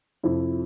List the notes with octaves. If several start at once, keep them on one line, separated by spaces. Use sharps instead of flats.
F2 C3 F3 E4